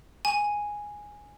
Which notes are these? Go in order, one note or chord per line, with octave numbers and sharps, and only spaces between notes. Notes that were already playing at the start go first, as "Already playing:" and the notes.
G#5